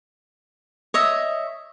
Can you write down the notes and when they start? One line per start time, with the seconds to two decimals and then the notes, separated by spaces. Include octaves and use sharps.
0.94 C#5 D#5 E5